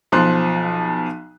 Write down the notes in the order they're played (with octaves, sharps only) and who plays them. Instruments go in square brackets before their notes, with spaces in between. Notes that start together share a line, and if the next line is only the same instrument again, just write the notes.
[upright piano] B1 F3 C6 F#6